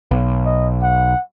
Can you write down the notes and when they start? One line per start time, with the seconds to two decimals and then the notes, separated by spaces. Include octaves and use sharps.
0.11 B1
0.46 D#5
0.82 F#5